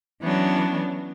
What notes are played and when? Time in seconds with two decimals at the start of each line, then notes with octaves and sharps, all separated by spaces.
0.22 E3 F#3 B3 C#4 D4